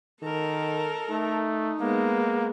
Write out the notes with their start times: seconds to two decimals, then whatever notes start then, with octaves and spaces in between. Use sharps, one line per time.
0.23 D#3 A4 A#4
1.10 A3 D#4
1.80 G#3 A#3 B3